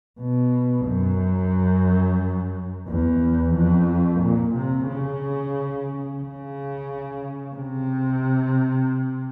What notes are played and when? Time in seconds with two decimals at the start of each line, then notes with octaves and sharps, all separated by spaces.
0.20 B2
0.87 F#2
2.88 E2
3.54 F2
4.21 A#2
4.55 C3
4.88 C#3
6.22 C#3
7.55 C3